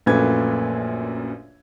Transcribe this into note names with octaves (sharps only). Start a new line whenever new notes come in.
A#1 F#2 A#2 A3 B4 G#6